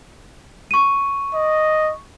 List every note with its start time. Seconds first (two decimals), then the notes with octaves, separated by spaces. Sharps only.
0.71 C#6 D#7
1.35 D#5